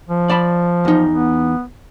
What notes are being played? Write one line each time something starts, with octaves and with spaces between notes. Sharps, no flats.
F3
D5 A5 B5
E2 D#4
B3